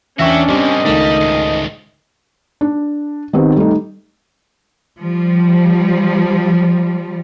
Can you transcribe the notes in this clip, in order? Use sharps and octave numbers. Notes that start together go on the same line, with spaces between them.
E2 C#4 D4 F#4 C#5 E5 G5 C#6
G2 G3 A#3 C4 G4 D#5
C#2 D#3 G3 A3
D2 G#2
D4
D#3 B3 C4 G4
G3 A3 D#4
F3 G3